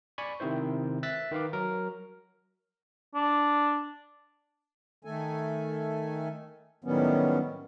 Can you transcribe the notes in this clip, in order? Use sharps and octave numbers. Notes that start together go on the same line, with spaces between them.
D5 G#5 B5 C#6
C3 D#3 C4 E4 C5
E5 E6 F#6 A6 B6
D#3 B4 F5 D6
F#3 A#4
D4
D#3 A3 A4 G#5
A2 D#3 F#3 G3 B3 C#4